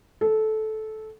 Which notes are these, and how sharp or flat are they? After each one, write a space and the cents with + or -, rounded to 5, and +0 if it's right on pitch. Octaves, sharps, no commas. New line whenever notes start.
A4 -15